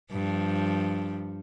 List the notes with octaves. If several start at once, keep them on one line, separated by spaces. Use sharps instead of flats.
G2 F3